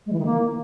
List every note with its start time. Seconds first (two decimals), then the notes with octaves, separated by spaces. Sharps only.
0.06 G#3
0.13 E3
0.19 D#3
0.25 A#3